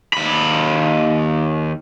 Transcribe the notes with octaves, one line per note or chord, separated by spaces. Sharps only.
D#2 B5